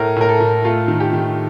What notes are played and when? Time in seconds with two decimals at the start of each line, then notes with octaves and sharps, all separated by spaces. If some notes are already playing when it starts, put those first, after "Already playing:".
Already playing: A2 A#4
0.16 A2 A#4
0.29 A4
0.40 A2
0.65 A3 F4
0.88 D#3
1.00 G4
1.13 D#3